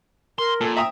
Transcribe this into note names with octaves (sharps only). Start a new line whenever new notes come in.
A#4 C6
A#2 A4
E5 G5 A#5 D#6